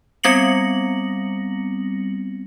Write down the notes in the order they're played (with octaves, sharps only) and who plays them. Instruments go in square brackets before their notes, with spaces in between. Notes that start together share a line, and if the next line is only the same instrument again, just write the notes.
[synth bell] G3 B3 C4 A#6 C#7 F#7